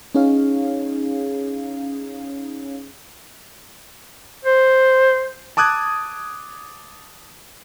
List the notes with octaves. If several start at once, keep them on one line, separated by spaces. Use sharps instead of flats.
C#4 D#4 G#4 C#5 F5
C5
A5 D6 D#6 F#6 G#6